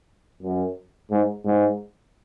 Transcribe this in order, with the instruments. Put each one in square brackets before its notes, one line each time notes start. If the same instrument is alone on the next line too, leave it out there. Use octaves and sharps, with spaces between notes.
[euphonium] F#2
G#2
G#2